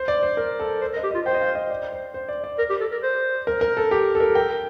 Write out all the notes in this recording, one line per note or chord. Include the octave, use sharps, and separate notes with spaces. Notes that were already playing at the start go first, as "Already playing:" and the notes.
Already playing: C5
D5
C5
A#4
A4
C5
A#4
D#5
G4
F4 D#5
C5 G5
D#5
F5
D#5
D5
C5
C5
D5
D5
A#4
G4
A4
A#4
C5
A#4
A#4
A4
G4
A4
A#4
A#4 G5